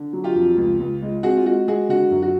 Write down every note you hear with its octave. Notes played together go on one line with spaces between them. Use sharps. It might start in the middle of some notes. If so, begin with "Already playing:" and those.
Already playing: D3
F#3
F4 G4
F2
C#2
C#2
G#3
C4 F#4 G#4
F4
G#3 F#4
G#3 F#4 G#4
D3 F#4
F#2
F#4